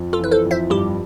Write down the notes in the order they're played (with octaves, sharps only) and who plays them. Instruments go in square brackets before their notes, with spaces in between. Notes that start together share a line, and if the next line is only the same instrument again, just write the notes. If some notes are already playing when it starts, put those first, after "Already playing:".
Already playing: [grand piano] F2
[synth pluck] F4 A4
[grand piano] E3 [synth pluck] B4
[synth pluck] A4 C5
[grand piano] F2
[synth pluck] C5 E5
[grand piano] G2 [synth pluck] E4 G4